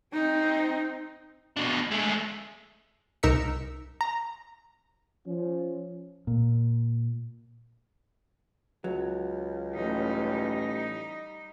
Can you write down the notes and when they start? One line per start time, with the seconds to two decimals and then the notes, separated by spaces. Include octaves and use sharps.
0.14 C4 D#4
1.56 B2 D4
1.91 G#3 A3
3.23 C2 D#4 A#4 E6 B6 C#7
4.01 A#5
5.27 F3 C#4
6.27 A#2
8.84 C#2 F#3
9.75 A1 G3 D#4